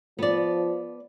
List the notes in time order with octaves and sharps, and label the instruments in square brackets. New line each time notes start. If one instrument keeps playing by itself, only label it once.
[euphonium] F3 [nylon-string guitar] B3 D5